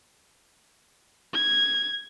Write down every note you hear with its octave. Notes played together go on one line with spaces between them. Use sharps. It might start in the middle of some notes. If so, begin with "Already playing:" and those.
G#6